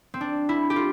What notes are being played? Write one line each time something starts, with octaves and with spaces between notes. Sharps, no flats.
C4
D4
E4
G4
F4